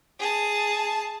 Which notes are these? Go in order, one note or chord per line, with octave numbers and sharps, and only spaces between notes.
G#4 A5